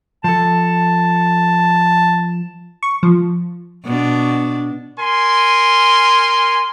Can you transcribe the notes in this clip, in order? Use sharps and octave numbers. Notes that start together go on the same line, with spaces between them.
F3 A4 A5
C#6
F3
B2 D4
A#4 G#5 C6